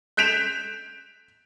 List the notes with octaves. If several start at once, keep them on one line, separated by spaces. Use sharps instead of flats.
F#6 G6 B6 D7 E7 F7